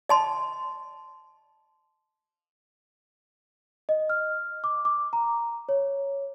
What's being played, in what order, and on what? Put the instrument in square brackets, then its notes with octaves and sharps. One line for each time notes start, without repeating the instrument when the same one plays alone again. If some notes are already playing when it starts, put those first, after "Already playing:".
[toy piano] D#5 A5 C6
[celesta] D#5
F6
D6
D6
A#5
C#5